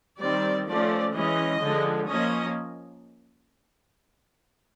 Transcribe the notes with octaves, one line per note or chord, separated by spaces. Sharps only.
D#3 G3 C4 D5
F3 A3 C#4 D5
E3 G#3 C#4 D#5
D3 F3 G#3
F3 A#3 C#4 D#5